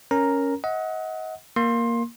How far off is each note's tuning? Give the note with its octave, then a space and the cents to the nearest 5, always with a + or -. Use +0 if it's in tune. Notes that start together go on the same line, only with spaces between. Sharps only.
C#4 +0 A#4 +5 A#5 +0
D#5 +35 F#5 +0
A#3 +0 C6 +20